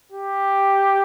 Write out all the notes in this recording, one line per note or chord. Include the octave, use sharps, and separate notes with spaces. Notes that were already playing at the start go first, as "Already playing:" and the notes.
G4